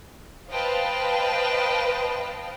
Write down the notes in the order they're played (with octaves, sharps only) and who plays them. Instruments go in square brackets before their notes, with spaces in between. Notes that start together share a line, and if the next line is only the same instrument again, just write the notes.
[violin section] B4 C5 D#5 F5 G5 A5